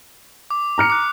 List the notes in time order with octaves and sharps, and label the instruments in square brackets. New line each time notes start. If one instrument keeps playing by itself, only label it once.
[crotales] D6
[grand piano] A#5 F6 C#7
[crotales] D6 F#6